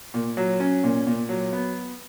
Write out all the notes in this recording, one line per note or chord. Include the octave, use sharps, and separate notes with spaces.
A#2
F#3
C#4
A#2
A#2
F#3
B3